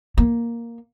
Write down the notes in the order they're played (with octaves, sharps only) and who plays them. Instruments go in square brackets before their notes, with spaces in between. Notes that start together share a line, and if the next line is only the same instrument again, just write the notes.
[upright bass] A#3